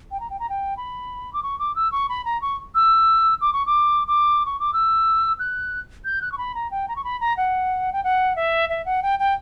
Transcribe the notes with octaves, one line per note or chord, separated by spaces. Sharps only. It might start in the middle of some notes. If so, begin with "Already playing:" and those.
G5
A#5
G5
A#5
G5
B5
D6
C#6
D6
E6
C#6
B5
A#5
C#6
E6
D6
C#6
D6
D6
C#6
D6
E6
F#6
G6
F#6
C#6
B5
A#5
G5
A#5
C#6
B5
A#5
F#5
G5
F#5
E5
E5
F#5
G5
G5